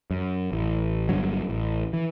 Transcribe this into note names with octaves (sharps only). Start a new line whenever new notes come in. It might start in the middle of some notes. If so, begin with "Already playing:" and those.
F#2
A1
G1 G2 D3 F#3
A1
E3